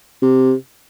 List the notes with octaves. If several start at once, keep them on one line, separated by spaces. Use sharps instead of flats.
C3